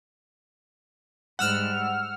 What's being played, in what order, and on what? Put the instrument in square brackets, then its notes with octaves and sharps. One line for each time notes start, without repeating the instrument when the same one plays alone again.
[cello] G#2 G3 [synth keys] F#5 E6 F6